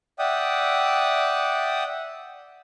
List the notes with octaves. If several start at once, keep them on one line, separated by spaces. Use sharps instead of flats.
D5 E5 F#5 G5 D#6